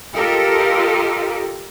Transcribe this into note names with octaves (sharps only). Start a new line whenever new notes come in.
F4 G4 A4 A#4 D#5